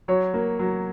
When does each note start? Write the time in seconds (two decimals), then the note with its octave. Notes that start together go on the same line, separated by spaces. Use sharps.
0.08 F#3 C#5
0.34 A#3
0.59 F#3